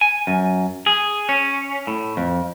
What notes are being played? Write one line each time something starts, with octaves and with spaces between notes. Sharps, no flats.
G#5
F#2
G#4
C#4
A2
F2